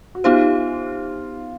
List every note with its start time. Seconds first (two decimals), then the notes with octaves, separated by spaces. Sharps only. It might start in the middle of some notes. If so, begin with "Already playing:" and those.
0.15 F#4
0.24 B3 D#4 F4 G4 C5